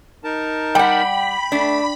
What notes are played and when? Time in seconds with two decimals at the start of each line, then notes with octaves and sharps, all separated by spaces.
0.24 D#4 A#4 A5
0.75 G3 F#5 G5 B5
1.52 A3 D4